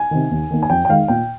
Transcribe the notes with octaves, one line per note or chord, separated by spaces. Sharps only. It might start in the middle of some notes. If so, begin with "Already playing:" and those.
Already playing: G#5
C3 D#3
D#2
D#3 A#3
G#5
F2 G5
G5
D#3 G#3 F5
A#2 G5